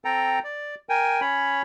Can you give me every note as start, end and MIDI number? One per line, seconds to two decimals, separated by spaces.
0.05 0.39 60
0.05 0.39 69
0.05 0.39 79
0.05 0.39 82
0.44 0.75 74
0.89 1.21 70
0.89 1.21 79
0.89 1.21 80
1.21 1.62 61
1.21 1.62 73
1.21 1.62 83